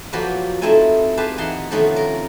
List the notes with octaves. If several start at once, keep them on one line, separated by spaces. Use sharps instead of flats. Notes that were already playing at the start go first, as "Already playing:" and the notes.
F3 F#3 A#3 F#4 G4 B4
A3 C4 D#4 E4 A4 G#5
G4 G#4 B4 C5 F5 A5
E3 D#4 F#5 A5 C6
C3 D#3 F3 A3 B3 C#4
A#4